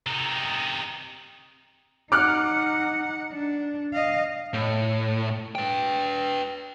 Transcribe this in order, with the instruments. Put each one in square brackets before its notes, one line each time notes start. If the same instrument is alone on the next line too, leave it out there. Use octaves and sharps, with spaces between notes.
[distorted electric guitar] C3 D#4
[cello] D#4 F#5 [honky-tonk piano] D6 F6 F#6
[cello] D4
D#5 F5
[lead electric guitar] A2
B4 G5